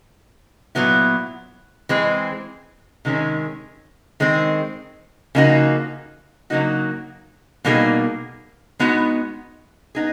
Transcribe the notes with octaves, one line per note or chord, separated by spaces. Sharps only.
A#2 F#3 B3 E4
E3 G#3 C4
C3 D#3 G#3 C#4
D#3 G#3 C4
C#3 F3 A#3 D#4 F#4
C#3 F#3 A#3 D#4 F#4
B2 G3 A#3 D#4 G#4
G#3 B3 D#4 F#4
B3 D#4 G#4